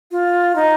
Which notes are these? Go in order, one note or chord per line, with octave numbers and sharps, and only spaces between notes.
F4
D#4